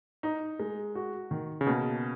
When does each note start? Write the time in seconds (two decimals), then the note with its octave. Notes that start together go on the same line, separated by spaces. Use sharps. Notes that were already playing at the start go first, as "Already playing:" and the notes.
0.23 D#4
0.60 G#3
0.95 F#4
1.31 D#3
1.61 C#3
1.67 B2 A#3